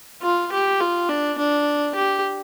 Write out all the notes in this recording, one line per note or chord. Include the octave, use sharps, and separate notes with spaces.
F4
G4
F4
D4
D4
G4